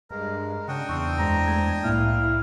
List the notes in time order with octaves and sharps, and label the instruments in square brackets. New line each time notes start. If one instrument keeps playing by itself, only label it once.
[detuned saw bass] G2 [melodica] G#3 [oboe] A#4
[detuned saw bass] C#3 [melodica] D4 G5 D#6 [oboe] F#4
[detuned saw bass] E2 [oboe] C4 [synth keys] C#6
[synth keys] F#2 G#3 C5 [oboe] A#5
[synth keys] G#3 A3 G#6
[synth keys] C2 A2 A#3 [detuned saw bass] E4 [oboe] F5